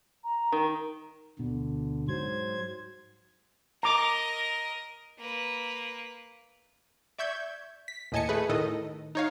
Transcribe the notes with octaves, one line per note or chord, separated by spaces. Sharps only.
A#5
D#3
D2 B2 D3
G#2 F#3 C5 G#6
A#4 D#5 A#5 D6
A#3 B4
D5 E5 C#6 G6 G#6
B6
D#2 A2 D#5 G#5 A5 C#7
A3 G#4 B4
A2 D#3 A4 D#5
D#4 C#5 F5